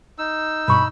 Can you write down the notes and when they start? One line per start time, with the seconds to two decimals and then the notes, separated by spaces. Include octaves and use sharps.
0.18 D#4 E6
0.68 G2 B2 B5 C#6